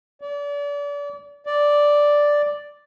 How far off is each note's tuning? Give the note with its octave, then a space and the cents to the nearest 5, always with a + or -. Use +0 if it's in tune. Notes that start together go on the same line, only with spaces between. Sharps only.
D5 -35
D5 +0